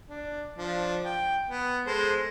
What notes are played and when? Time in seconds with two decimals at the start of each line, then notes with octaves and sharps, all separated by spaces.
0.08 D4
0.58 F3 D4
1.05 G5
1.48 B3
1.86 G#3 A4 C5